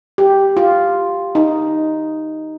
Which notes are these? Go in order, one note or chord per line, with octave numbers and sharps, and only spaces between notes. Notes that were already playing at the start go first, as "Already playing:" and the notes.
G4
F4
D#4